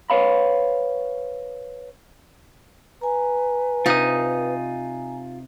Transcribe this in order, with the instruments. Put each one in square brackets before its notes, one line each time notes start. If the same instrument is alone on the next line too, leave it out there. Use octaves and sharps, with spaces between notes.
[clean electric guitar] B4 C#5 F5 B5
[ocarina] B4 [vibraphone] G#5 A#5
[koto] C3 D#4 [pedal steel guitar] F4 D#6